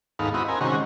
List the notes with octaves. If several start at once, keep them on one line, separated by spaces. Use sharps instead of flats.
D#2 G#2 B3 D#4 A4 F5
C4 E4 F#4 D#5 B5
C4 A#4 G#5
C3 D#3 G#3 C#4 F#4